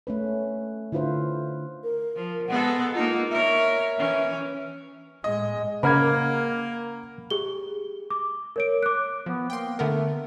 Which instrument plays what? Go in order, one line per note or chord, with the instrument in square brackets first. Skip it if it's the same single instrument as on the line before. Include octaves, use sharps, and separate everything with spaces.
[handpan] A3 C#4 B4
D3 E4 F4 B4 C5
[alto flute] A#4
[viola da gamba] F3
[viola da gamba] G#3 B3 A4 [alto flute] F#5
[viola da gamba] A#3 D#4 [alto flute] F4
[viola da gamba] A#4 C#5 [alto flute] E5
[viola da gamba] E3 C#4
[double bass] A2 G#3 [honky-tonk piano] D#5
[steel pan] C#3 [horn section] A#3 [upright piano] A#4 F#5 A#5 [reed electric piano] B5 F6 G#6
[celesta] G4 G#4 G7
D6
A#4 C#5 D7
D6 F#6
[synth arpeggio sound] F3 [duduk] B3
[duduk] A#3 [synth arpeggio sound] G5 C6
[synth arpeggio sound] D3 B3 A#4 [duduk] A3